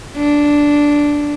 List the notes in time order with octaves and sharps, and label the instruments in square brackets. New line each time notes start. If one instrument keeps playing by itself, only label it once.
[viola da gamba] D4